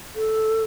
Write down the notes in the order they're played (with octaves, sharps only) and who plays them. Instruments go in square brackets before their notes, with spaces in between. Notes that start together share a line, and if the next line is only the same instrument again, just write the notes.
[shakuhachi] A4